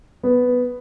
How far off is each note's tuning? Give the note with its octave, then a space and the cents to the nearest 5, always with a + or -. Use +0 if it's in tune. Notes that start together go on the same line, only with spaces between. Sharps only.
B3 +5